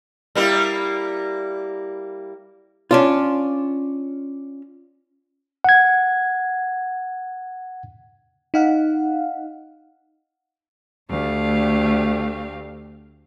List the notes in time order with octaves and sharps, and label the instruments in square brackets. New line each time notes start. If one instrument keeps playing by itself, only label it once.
[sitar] G3 A#3 E4
[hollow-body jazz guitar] C#4 D4 F4
[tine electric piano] F#5 G#6
[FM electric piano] D#4 F5 F#5
[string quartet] D2 A3 G4 F5